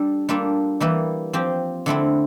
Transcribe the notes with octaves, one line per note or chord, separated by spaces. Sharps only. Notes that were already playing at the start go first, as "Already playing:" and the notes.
Already playing: G3 D4 A4
G3 A#3 D4 F4 A4
E3 G3 A#3 E4
F3 C4 G4
D3 A3 C4 E4